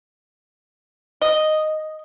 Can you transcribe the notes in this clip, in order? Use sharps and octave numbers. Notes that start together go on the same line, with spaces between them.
D#5